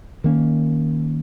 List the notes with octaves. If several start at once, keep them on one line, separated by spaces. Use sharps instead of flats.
D#3 A#3 C#4